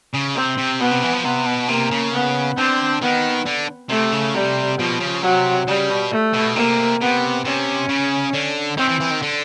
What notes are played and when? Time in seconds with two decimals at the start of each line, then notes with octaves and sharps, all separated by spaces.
0.14 C#3
0.36 C3 C4
0.57 C3
0.80 B2 B3
0.91 C3
1.03 E3
1.13 F3
1.24 C3 B3
1.46 B2
1.69 C3 A#3
1.91 C#3
2.13 B3
2.57 D3 C4
3.02 D#3 B3
3.46 D3
3.90 C3 A3
4.12 C#3
4.34 C3 G3
4.78 B2 F3
5.00 C#3
5.22 C3 F#3
5.67 C#3 G3
5.90 B2
6.11 A3
6.34 B2
6.56 C3 A#3
7.01 C3 B3
7.45 C3 C#4
7.89 C#3
8.33 D3
8.77 D#3 C4
8.88 E3
9.00 E3
9.11 D#3
9.22 D3